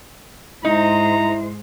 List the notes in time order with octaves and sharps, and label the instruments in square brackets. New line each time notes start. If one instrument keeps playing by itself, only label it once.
[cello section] G#2 G#3 C5 [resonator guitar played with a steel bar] D#4 [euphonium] E4 [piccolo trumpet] A#5